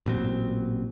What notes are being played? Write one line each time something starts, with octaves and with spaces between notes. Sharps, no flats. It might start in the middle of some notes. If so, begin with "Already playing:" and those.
A1 A#2 F#3 C4